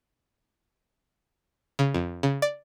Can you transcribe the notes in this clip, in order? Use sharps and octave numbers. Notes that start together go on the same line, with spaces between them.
C#3
F2
C#3
D5